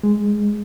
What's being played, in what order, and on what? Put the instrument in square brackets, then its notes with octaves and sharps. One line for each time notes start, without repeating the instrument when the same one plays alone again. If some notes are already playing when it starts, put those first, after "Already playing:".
[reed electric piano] G#3